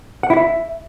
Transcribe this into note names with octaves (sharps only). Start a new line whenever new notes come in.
F#5
E4
E5